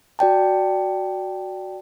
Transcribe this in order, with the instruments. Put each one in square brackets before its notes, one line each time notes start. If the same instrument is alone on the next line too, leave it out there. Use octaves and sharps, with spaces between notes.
[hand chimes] F#4 D5 G5 A5